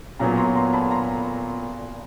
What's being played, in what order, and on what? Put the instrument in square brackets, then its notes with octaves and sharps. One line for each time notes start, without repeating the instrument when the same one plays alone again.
[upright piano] A#2 F#3 B3 [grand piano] G#5 A#5
[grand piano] A#5 C6
A#5 C6
A5 B5
A#5 C6